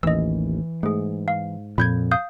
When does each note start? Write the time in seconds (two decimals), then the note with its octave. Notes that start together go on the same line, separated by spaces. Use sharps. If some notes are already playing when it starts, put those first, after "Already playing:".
0.03 A1 D#2 E3 D#5 E6
0.83 G#2 A3 G#4
1.28 F5
1.78 F2 A#2 B5 G6 G#6
2.11 F5 D#6 G6